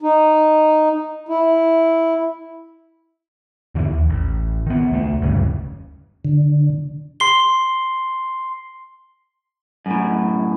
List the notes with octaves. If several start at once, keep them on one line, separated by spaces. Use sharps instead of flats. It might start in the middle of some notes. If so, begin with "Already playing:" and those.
D#4
E4
E2 D3 E3
D#2
A1
D#3 B3
C#2 A3
F#1 D2 G2 C#3
D3
C6 C7 G7
F#2 A2